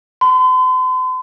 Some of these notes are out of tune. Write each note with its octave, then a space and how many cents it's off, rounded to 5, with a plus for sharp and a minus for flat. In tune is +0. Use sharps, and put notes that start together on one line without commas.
C6 -45